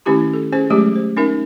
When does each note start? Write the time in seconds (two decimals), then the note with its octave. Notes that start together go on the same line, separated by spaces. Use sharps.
0.06 D#3 A3 C#4 E4 G4 A#5
0.33 A4
0.53 C#4 G#4 C5
0.70 F#3 G#3 A3 G4
0.96 C5
1.17 C#4 D#4 A#4 E5